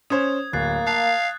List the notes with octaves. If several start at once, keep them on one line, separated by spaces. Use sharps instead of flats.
C#4 C5 D#6 G#6
D1 A#3 F#6 A6 C7
F5 A5 F#6